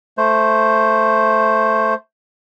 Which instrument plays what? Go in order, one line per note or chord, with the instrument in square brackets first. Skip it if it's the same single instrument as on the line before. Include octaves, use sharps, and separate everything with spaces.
[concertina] A3 C5